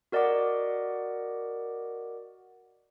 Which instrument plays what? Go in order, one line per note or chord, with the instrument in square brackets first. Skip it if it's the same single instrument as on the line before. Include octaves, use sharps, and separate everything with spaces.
[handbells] F#4 A#4 D5 D#5 F#5 D6